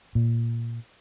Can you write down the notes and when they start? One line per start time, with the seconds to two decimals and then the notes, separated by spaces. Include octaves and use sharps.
0.15 A#2